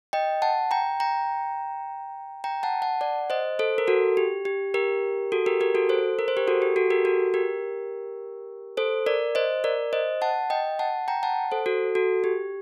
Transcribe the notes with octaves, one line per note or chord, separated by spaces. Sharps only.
D#5 G5
F#5 A5
G5 A#5
G5 A#5
G5 A#5
F#5 A5
F#5 A5
D5 F#5
C5 D#5
A4 C5
A#4
F#4 A4
G4
G4
G4 A#4
F#4 A4
G4 A#4
G4 A#4
F#4 A4
A4 C5
A#4
C5
G4 A#4
F#4 A4
G4
F#4 A4
G4 A#4
F#4 A4
G4 A#4
A4 C5
A#4 D5
C5 D#5
A#4 D5
C5 D#5
F#5 A5
D#5 G5
F#5 A5
G5 A#5
F#5 A5
A4 C5
F#4 A4
F#4 A4
G4